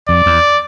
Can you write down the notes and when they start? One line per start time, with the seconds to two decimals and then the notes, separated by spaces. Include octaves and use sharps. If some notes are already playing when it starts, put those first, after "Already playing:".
0.09 F2 D5
0.26 E2